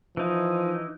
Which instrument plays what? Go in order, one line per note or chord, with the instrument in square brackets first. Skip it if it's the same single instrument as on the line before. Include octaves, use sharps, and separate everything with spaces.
[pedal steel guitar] E3 D#4 [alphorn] F3